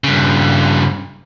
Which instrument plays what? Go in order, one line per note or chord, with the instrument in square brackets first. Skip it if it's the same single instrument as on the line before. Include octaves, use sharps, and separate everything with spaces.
[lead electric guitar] G2 C#3